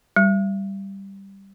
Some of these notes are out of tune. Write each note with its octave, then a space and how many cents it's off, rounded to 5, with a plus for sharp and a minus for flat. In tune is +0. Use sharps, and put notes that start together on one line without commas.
G3 +0